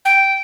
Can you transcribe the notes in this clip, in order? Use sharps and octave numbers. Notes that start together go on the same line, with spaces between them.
G5